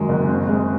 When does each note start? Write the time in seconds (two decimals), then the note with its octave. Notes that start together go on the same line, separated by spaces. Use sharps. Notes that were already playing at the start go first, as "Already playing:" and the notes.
Already playing: F#2 D#3 G#3
0.09 F#1
0.29 C4
0.48 G#3